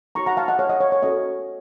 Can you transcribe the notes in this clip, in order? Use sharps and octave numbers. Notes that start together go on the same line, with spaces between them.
D#4 F#4 A#4 C#5 A#5 C#6
F#5 A#5
F5 A5
D#5 F#5
C#5 F5
D#5
C#5
C#5
C#4 F#4 A4 D#5